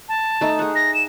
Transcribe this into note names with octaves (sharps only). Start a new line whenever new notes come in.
A5
A3 D#4
G#4 F#5
A#6
E7